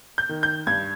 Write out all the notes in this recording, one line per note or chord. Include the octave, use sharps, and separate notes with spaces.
G6
D#3
G6
G2 G#6